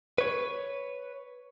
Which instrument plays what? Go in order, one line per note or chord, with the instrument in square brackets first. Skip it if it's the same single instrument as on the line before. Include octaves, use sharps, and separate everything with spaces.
[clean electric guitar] B4 C#5